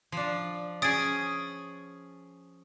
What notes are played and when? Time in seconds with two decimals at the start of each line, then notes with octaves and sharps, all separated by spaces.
0.12 F3 D4
0.82 C#4 G#4 D#6 A6 D7